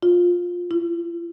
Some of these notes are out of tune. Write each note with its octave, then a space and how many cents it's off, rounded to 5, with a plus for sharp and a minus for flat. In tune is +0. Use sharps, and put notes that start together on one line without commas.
F4 +15
F4 -45